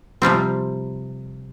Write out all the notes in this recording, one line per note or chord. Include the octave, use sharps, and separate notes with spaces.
C3 F3 G3 C4